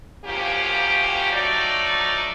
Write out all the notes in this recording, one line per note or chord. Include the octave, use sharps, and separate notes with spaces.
D2 F3 A#3 C#4 G4
F3 F#3 A3 D#4 D5